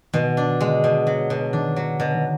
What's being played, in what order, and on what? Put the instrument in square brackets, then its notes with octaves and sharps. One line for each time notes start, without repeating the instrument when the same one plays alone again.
[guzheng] B2 [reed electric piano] D#3
[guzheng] D4
[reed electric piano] D3 [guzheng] G#3
[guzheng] B2
F#3
B2
[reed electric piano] D#3 [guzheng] D4
[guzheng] F#3
[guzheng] B2 [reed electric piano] D3
[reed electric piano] D#3